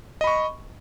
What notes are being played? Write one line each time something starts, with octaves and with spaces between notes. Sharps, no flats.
D#5 B5 C#6